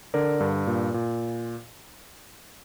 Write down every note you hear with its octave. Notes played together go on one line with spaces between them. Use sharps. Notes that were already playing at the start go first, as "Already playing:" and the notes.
D3 A#4 D5
G2
A#2
A#2